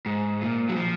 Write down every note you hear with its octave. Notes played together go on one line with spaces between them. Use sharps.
G#2
A#2
F#3
F3